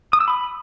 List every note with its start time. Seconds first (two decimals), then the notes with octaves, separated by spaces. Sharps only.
0.13 D#6
0.20 E6
0.28 B5